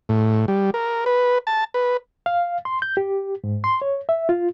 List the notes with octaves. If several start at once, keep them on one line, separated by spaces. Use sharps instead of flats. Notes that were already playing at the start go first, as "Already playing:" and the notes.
A2
G3
A#4
B4
A5
B4
F5
C6
G6
G4
G#2
C6
C#5
E5
F4